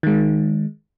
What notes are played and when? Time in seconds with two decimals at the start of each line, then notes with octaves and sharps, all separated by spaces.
0.03 D#3 G#3